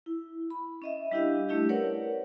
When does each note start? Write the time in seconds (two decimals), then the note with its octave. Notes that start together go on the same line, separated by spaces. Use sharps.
0.06 E4
0.50 B5
0.82 C#4 D#5 E5
1.12 G3 D4 E4 G4 D#5 F5
1.49 A3 C#4 E4 G4
1.69 A#4 B4 C#5 D5 F#5